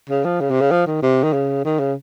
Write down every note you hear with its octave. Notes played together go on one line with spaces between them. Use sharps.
C#3
F3
C#3
C3
C#3
F3
D#3
C3
D#3
C#3
D#3
C#3